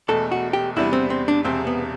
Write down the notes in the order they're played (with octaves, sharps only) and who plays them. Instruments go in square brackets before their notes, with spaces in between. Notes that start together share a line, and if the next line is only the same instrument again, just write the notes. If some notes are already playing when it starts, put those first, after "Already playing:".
[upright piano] E1 E2 B2 A3 [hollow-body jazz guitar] A4
[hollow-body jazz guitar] F#4
G4
[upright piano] E2 C3 G3 B3 D4 [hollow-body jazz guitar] E4
[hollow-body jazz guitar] C4
C4
D4
[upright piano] E1 E2 C3 [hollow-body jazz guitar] C4
[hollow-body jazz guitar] B3